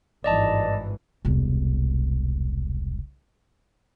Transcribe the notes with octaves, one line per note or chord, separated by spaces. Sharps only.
G#1 G2 E3 D5 D#5 A5
E1 C2